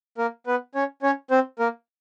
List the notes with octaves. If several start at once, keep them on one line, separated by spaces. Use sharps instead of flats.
A#3 A#4
B3 B4
C#4 C#5
C#4 C#5
C4 C5
A#3 A#4